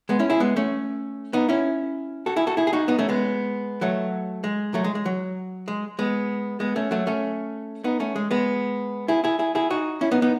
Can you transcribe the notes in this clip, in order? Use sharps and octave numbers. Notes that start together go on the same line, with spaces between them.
G#3 B3
C#4 E4
E4 G#4
G#3 B3
A3 C#4
B3 D#4
C#4 E4
F#4 A4
E4 G#4
F#4 A4
E4 G#4
G#4
D#4 F#4
B3 D#4
A3 C#4
G#3 B3
F#3 A3
G#3
F#3 A3
G#3
G#3
F#3
G#3
G#3 B3
G#3 B3
A3 C#4
F#3 A3
A3 C#4
B3 D#4
A3 C#4
G#3
G#3 B3
E4 G#4
E4 G#4
E4 G#4
E4 G#4
D#4 F#4
C#4 E4
B3 D#4
B3 D#4